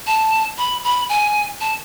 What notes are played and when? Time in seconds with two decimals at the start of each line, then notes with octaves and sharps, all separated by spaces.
0.07 A5
0.58 B5
0.84 B5
1.09 G#5
1.61 A5